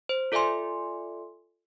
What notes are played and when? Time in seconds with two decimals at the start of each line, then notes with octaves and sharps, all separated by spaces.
0.09 C5
0.32 F4 A4 D5 E5 G#5 C6